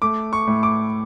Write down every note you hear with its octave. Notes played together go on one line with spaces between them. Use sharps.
A3 D6
C#6
A2
D6